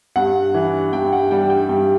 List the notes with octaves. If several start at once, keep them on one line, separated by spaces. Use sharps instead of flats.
G2 F#5
E3
G2 G5
F#5
G3 G5
G5
G2 G5